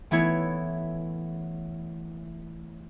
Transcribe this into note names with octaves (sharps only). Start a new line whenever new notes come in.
E3 A3 B3 E4 C#5